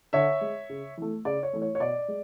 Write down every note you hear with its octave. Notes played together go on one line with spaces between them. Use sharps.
D3 C#5 E5
G#3
C#3
E3 A3
C#3 D5
C#5
E3 A3
C#5
C#5
B2 D5
G#3